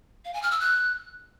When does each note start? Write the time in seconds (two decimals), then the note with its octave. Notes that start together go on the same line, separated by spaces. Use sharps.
0.25 F5
0.34 G#5
0.43 F6
0.51 E6
0.60 F#6